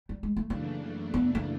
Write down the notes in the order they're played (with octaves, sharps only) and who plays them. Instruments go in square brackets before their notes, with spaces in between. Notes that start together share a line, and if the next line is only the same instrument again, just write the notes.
[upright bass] G3
G#3
A3
[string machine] F#2 C#3 E3 A3 D4 [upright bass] A#3
[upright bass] B3
A#3